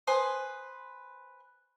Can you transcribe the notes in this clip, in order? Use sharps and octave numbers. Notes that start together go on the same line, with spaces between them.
B4 C5 G#5 D#6